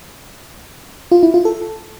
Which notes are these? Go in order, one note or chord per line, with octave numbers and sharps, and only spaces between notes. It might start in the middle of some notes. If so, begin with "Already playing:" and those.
F4
E4
F4
A4